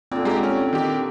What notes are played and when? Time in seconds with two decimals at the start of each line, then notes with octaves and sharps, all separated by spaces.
0.11 A#2 D3 C4
0.25 G#3 G4 A#5
0.43 C#4
0.73 D#3 G4